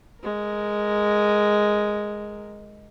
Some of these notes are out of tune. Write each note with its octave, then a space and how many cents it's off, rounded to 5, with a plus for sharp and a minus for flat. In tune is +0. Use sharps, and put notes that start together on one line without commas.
G#3 +0 A#4 +0